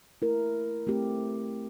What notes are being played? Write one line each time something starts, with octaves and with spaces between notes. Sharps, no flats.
A3 E4 A#4
A3 C4 G4